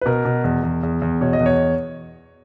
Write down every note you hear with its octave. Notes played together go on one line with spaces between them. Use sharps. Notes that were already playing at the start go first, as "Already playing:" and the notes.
B4
B2 A#4
B2
E2
E2
E2
E2
B2 C#5
D#5
E2
C#5